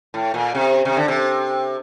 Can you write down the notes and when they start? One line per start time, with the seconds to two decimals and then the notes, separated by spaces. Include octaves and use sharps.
0.14 A2
0.34 A#2
0.55 C3
0.85 C3
0.97 D3
1.08 C3